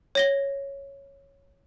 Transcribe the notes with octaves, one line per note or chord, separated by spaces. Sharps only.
C#5 A#6 G7